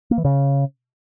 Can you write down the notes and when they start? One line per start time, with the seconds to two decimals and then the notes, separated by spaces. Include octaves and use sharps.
0.11 A#3
0.18 E3
0.25 C#3